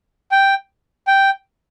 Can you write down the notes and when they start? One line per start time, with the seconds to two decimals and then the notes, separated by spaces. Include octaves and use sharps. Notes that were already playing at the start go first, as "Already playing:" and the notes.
0.32 G5
1.07 G5